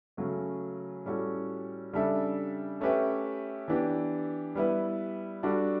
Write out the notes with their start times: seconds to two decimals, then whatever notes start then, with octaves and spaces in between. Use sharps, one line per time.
0.17 C#3 F#3 A3 C#4
1.05 A2 G3 C#4 F#4 A4
1.93 C#3 G3 D4 A4 E5
2.81 A3 C#4 G4 B4 E5
3.68 E3 B3 D4 G4
4.55 G3 B3 E4 B4
5.43 G3 D4 F#4 A4 D5